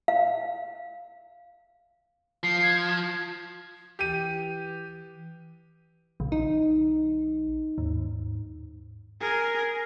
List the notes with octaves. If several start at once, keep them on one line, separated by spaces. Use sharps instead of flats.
F5
F3 C7
G#6
E3 G4 D#7
A#1 C#3
A#1 D#4
D#2 G#2
G#4 A#4